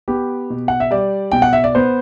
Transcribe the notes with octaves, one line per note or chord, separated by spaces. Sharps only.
B3 G4
B2
F#5
E5
G3 D5
B2 G5
F#5
E5
D5
B3 C5